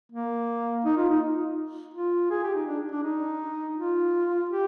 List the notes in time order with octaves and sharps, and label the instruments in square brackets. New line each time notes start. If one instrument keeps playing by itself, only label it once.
[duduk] A#3
D#4
F4
D#4
F4
G#4
G4
D#4
D4
D4
D#4
F4
G4